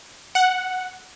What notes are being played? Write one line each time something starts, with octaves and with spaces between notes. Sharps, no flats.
F#5